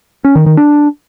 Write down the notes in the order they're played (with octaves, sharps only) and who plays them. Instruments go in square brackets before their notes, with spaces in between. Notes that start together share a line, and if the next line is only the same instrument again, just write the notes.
[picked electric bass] C#4
D#3
D#3
D4